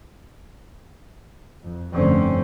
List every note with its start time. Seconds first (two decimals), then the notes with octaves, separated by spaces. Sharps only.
1.60 F2
1.94 F1 G2 D3 C4 C#4